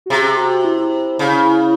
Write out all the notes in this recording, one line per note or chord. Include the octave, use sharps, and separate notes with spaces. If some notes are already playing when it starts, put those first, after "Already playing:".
F#4
C3 G#4
F#4
E4
C#3